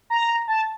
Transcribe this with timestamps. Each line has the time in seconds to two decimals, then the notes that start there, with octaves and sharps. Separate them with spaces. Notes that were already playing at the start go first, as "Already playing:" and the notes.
0.10 A#5
0.48 A5